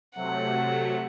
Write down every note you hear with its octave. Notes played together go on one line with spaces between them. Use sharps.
C3 F#3 A3 F#5